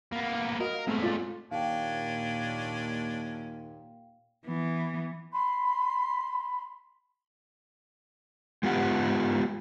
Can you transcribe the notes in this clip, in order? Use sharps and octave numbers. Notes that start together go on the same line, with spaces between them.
A#3 B3
F#4 A#4 D#5
F5
G#2 A3 B3 C4 E5
F4 D5
D#2 A#2 C#4 D4 F5 G5
E3 B3
B5 C6
G#3 B3 F4 G4 F#5 G5